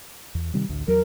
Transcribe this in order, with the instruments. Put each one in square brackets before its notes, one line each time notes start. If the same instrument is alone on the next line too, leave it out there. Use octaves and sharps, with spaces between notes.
[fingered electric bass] E2
C3 D#3 G3
A1 D2
[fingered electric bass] E2 F#3 [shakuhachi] A#4